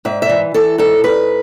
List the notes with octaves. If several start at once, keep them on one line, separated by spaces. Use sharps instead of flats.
G#2 E5
E5
E3
E3 A4
G#2 A4
G#2 B4